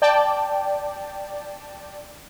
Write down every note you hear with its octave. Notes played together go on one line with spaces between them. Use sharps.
D5 G5 A5